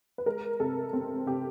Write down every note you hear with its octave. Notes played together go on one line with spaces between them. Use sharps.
B4
G#3 A#4
C3 A4
C4
C3 G4